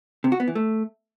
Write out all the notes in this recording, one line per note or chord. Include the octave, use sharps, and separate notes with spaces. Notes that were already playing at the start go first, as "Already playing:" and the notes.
C3
F#4
B3
E3
A3